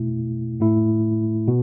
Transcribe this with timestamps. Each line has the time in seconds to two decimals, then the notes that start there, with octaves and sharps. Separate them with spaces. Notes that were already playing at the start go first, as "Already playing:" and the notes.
Already playing: B2 A3 E4
0.60 A2 A3 E4
1.48 B2